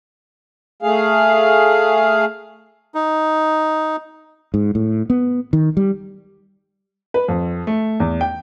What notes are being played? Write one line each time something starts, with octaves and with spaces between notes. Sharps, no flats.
A3 G#4 F5
D#4
G#2
A2
B3
D#3
G3
B4
F2
A3
E2
G5